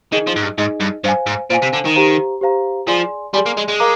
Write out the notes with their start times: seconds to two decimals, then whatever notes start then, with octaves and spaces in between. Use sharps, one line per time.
0.12 D#3 D#4 G#4 D#5
0.27 F3
0.36 G#2
0.42 G2
0.58 G#2 D#4 G#4 D#5
0.80 G2
1.04 G2 C5 F5 G#5
1.27 G#2
1.50 A#2 C5 F5 G#5
1.62 C3
1.73 D3
1.85 D#3
1.96 G4 C5 F5 A#5
2.41 G4 C5 F5 A#5
2.88 F3 G#4 D5 G#5 C6
3.33 G3 G#4 D5 G#5 C6
3.46 A#3
3.57 G#3
3.68 G#3
3.80 A#4 F5 A#5 D6